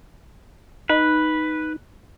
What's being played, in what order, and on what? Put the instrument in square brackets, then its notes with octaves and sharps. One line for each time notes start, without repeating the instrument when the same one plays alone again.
[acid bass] D#4 [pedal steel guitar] B4